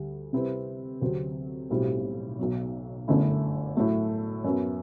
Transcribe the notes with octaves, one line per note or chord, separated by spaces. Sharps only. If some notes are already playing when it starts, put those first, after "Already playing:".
Already playing: D2 G3
C3 G3 C4 E4 B4
D2 C3 F#3 C4
B1 A2 G3 C4 F#4
B1 B2 F#3
G1 F#2 D3 A3 E4
A2 F#3 A3
F#2 F#3 B3